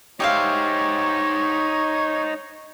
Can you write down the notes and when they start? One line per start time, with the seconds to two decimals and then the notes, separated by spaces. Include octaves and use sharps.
0.20 D#4 G4 C5 C#5 E5 F5